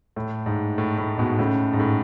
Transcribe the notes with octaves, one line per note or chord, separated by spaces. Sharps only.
A2
G#2
A2
A2
G#2 B2
A2 C#3
G#2
A2